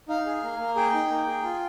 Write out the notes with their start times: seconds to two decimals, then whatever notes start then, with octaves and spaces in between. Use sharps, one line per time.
0.08 D#4 F5
0.26 G#4
0.43 A#3
0.59 A#3
0.76 G#4 G5
0.93 D#4
1.10 A#3
1.27 G#4
1.44 F4